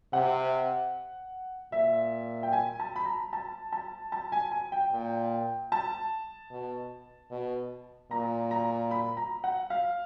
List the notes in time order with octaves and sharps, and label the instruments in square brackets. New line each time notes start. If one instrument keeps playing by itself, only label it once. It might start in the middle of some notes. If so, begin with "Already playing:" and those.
[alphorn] C3 [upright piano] F#5
[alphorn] A#2 [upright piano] E5
[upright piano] G5
G#5
A5
B5
A#5
A5
A5
A5
G#5
G#5
G5
[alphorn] A#2
[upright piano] A5
[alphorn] B2
B2
[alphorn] A#2 [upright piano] A#5
[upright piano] A#5
B5
A#5
F#5
F5